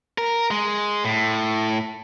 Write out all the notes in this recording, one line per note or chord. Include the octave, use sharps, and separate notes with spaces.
A#4
G#3
A2